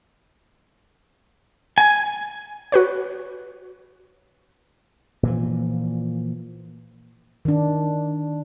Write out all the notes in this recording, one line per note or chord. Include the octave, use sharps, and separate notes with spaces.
G#5
F#4 B4 C#5
A#2 E3 F3
D#3 D4